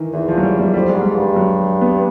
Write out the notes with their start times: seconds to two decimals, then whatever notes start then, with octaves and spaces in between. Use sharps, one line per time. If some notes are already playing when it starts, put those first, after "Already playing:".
Already playing: D#3 E3
0.13 E2 E3
0.28 F3
0.38 F#3
0.43 G3
0.59 G3
0.74 F2 G3
0.89 G#3
0.94 G#2
1.01 G3
1.15 G2
1.36 F#3
1.81 B3